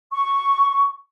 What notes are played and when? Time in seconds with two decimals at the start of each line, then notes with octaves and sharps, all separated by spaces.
0.12 C#6